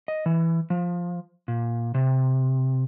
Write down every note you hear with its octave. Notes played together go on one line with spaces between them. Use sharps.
D#5
E3
F3
A#2
C3